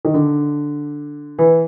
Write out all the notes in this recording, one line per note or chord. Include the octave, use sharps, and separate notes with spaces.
D#3
D3
E3